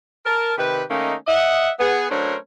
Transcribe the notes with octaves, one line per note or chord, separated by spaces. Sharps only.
A#4 A5
C3 D#3 G4 B4
D#3 A3 A#3 C#4 D#4
D#5 E5 F#5
B3 G#4
F#3 A3 C#4 D4 A#4 C5